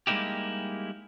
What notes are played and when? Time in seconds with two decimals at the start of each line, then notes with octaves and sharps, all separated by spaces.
0.07 G3 G#3 A#3 D#4 E4 G4